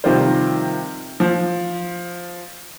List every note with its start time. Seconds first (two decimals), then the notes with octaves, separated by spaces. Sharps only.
0.04 C3 D#3 F3 G3 F4 C5
1.20 F3